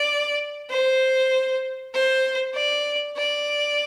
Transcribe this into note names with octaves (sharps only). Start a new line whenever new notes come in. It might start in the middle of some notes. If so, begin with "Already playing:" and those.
Already playing: D5
C5
C5
D5
D5